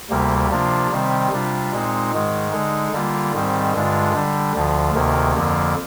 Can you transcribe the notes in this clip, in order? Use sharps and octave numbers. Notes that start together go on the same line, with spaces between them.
D2 C3 G3 A#3
C3 F3 A#3 D4 F4
C3 D#3 G3 C4
C3 G3 D4 F4
A#2 G#3 C4 D#4
G#2 D#3 G#3
D3 G#3 D#4
D3 G3 A#3 F4
G#2 D#3 G3 C4
G2 D3 G#3 D4 F4
D3 G3 D4
D2 D3 F3
D2 C3 D#3 A#3
F2 D3 F3 A#3